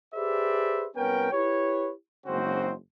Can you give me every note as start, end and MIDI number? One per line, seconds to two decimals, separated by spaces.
0.15 0.87 67
0.15 0.87 68
0.15 0.87 71
0.15 0.87 72
0.15 0.87 74
0.15 0.87 76
0.96 1.31 36
0.96 1.31 59
0.96 1.31 61
0.96 1.31 70
0.96 1.31 79
1.32 1.92 64
1.32 1.92 67
1.32 1.92 71
1.32 1.92 73
2.26 2.74 30
2.26 2.74 44
2.26 2.74 49
2.26 2.74 60
2.26 2.74 66
2.26 2.74 72